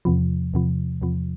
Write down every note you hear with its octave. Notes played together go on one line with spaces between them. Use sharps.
E2 C3 F3
E2 C3 F3
E2 C3 F3